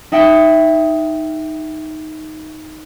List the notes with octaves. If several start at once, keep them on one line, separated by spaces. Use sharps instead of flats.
D#4 E5 F#5 G5